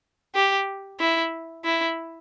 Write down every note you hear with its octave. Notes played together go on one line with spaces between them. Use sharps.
G4
E4
E4